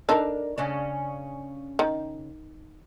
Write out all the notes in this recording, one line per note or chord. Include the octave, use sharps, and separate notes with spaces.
D4 D#4 A4 A#4
C#3 C#4 D4
D#3